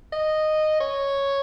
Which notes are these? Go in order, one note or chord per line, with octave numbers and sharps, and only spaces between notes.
D#5
C#5